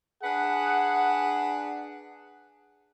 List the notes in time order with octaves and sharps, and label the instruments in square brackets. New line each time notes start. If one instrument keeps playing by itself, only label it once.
[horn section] D4 G#4 B4 F#5